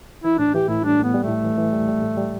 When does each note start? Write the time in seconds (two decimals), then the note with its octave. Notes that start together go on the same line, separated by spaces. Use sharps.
0.24 E3 E4
0.39 A2 D4
0.54 E3 G4
0.68 A2 E4
0.83 G3 D4
0.99 A2 B3
1.14 G3
1.24 A2 A3
1.44 E3
1.58 E3
1.73 G3
1.88 G3
2.03 A2
2.17 G3